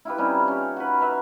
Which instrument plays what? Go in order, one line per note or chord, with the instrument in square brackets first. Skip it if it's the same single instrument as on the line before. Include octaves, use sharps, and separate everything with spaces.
[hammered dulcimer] E4 F4 G4 B4
G3 C4 C#4 D#4
C#4 G4
F#4 B4
A#4 B4 E5